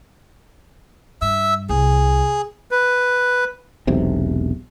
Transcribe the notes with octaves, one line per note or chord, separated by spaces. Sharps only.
G2 E5 E6
C2 G#4
B4
E1 B1 C3